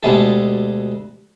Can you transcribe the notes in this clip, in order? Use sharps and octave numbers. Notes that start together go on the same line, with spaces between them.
D2 B2 G3 G#3 G#4 A4